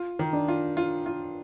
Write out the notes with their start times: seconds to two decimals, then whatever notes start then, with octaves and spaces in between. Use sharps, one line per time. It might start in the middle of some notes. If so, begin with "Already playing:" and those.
Already playing: F4
0.19 D#3
0.33 D4
0.48 F4
0.77 F4
1.06 F4